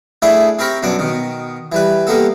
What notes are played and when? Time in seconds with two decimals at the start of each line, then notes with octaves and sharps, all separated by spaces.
0.22 A3 D4 E4 G#4 D5
0.59 C4 G4 A#4 B5 C#6
0.82 B1 F#2 B2 D4 D5
0.99 B2 D#3
1.72 E3 G3 B4
2.07 G3 A#3 B3 A4